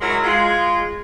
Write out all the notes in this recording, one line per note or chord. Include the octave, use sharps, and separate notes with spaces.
F#3 G#3 E4 A#4
G#3 F4